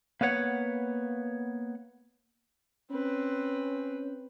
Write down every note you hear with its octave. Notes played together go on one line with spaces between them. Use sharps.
A#3 B3 B4 C#5 F#5
C4 C#4 B4